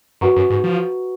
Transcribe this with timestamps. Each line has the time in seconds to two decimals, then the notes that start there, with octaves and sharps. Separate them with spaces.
0.21 F#2 F#4 B4 F#5 A#5 C#6
0.36 F#2
0.50 G#2
0.64 F3